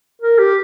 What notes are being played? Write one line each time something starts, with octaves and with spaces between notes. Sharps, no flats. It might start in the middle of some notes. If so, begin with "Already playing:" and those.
A#4
G4